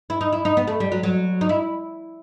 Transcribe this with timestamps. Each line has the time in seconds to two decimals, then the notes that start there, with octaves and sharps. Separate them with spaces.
0.10 E4
0.21 D#4
0.33 E4
0.45 D#4
0.57 B3
0.67 A3
0.80 G3
0.92 F#3
1.03 F#3
1.41 D#4
1.49 E4